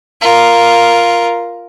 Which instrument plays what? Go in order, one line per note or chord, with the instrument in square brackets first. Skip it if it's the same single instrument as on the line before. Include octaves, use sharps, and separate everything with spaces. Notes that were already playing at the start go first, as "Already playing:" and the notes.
[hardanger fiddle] F4 A#4